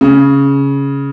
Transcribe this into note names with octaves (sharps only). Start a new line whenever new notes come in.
C#3